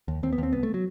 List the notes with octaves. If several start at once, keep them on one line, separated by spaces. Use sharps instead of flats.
D#2
D#2 C4
B3
D#2 C4
C2 B3
A3
F#3